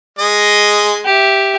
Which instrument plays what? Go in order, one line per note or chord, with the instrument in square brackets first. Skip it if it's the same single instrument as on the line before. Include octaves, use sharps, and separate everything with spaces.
[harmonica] G#3 D#5
[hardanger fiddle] G4 E5